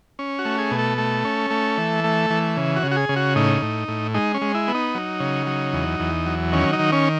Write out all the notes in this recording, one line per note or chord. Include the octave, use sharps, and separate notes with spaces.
C#4
F#4
A3
G#4
B2
A4
A3
C#4
A3
E3
A3
E3
C#3
F#4
C#3
F#4
G#4
C#3
F#4
A2 D#4
A2
A2
G#3 D#4
C#4
G#3
E4
B3
D#4
F#3
C#3
F#3
E2
E2
F#3
D#3 C#4
D#4
D#3
C#4